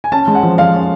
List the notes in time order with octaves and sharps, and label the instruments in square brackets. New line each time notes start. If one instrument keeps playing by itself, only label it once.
[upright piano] G#5
[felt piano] C#4 [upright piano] A5
[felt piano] G#3
[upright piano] F#5
[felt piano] F3
[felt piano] F3 [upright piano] F5
[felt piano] C#4